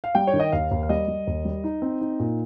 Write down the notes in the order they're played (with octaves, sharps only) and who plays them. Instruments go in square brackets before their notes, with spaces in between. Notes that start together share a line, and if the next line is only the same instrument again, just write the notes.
[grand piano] F5
G3 G5
C#5
D#3
D#5
D#2 F5
D#2
F5
G3 D#5
G3
D#2
G3
D#4
C4
D#4
A#2